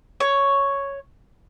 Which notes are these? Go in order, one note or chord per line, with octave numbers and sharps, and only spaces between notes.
C#5